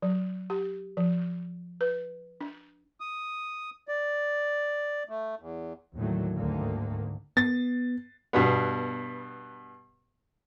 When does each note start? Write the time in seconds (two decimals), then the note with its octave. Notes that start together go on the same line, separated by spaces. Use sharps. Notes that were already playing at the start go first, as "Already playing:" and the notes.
0.02 F#3
0.50 G4
0.97 F3
1.81 B4
2.41 D4
3.00 D#6
3.88 D5
5.09 A3
5.39 E2
5.95 D#2 A2 D3 D#3 F#3 A3
6.35 D2 G#2 D3 D#3 A3 A#3
7.37 B3 A6
8.33 G2 B2 B3